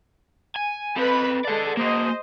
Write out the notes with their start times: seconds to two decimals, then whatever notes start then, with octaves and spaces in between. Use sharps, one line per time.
0.56 G#5
0.96 C4 A4 B4 B5
1.44 G#3 A4 D5 F#5
1.77 A#3 F#4 C5 D#5